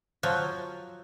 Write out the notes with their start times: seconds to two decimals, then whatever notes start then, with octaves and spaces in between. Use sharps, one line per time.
0.23 F3 F#3